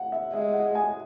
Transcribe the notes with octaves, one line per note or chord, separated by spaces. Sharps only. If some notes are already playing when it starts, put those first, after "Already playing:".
Already playing: F#5
E5
G#3 E5
F#5
G#5